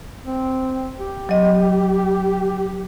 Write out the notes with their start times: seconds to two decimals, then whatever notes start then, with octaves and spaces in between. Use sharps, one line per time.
0.24 C4
0.99 G4
1.29 F#3 D#5